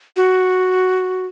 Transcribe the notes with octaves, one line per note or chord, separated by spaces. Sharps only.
F#4